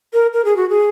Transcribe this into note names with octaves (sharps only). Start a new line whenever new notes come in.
A#4
A#4
G#4
F#4
G#4